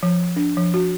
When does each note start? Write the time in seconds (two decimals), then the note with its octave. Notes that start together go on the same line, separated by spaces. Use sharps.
0.03 F3
0.36 D4
0.57 F3
0.74 F#4